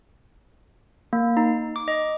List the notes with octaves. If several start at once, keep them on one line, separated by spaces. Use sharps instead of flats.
A#3
D#4
D6
D#5